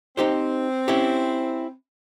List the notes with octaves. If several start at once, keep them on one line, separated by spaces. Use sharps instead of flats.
C4 D#4 G4 C5
C#4 E4 G4